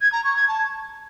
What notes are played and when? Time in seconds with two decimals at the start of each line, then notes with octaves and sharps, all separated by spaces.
0.01 G#6
0.13 A#5
0.24 C#6
0.36 G#6
0.48 A5